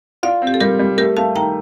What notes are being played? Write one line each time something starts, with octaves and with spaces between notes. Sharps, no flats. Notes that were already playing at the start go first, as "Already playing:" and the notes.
F4 D5 F5
C4
G4
A4
G3 G4 A#4
G3
A3 G4 A#4
A3 F5 A5
D#3 G5 A#5